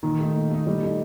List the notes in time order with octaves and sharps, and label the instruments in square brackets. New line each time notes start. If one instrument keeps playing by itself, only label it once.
[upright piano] A#2 [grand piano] D#3
[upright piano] A3 D#4
A#2
A3 D#4
[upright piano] A#2 [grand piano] G3
[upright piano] A3 D#4